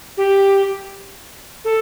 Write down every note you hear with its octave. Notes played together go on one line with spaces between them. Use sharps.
G4
A4